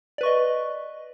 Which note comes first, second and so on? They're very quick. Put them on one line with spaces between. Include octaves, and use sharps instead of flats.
D5 B4 C#6 D#5